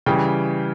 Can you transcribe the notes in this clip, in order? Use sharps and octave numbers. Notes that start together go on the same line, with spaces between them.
C#3 E3 G3 G5